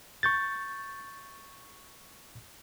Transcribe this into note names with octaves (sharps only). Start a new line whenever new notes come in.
C#6 G6 A6